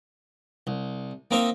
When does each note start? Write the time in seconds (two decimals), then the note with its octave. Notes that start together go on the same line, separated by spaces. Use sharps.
0.67 C2
1.31 A#3 C4 D#4 A#4 D#5 E5